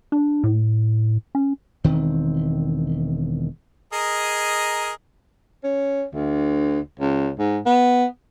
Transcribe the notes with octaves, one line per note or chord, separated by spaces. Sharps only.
D4
A2
C#4
E1 D#3 C4
G#4 A#4 D#5
C#4
D2
C#2
G#2
B3